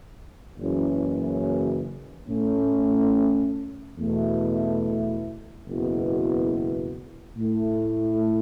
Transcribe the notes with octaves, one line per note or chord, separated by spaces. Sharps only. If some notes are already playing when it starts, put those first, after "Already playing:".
F#1 F#2 E3 C#4
A2 A3 C#4
E2 B2 A3 E4
F#1 E2 B2 B3 E4
A2 A3 E4